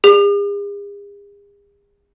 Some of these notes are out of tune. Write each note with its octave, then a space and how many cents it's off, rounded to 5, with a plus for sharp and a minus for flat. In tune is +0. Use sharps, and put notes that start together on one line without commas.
G#4 -45